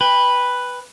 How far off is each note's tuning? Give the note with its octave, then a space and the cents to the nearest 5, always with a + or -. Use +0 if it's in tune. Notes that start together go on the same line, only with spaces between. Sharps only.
B4 +0 G5 +30